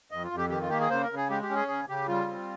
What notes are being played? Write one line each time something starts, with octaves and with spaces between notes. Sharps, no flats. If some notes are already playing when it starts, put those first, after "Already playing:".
F2 D#5
F4
F2
G4
D#3 G4
F4
A#3 G4
G#4
C#3 C5
A#4
C#3
G#4
G#3 G4
G4
C#4
G#4
C#3 G#4
C#3 G4
G3 F4
C4